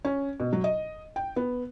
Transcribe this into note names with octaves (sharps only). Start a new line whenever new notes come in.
C#4
B2
F#3
D#5
G5
B3